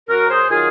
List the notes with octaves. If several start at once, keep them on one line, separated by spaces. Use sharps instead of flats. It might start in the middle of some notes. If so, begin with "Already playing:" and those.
F#2 F#4 A#4
G#4 C5
D#3 F#3 F4 G#4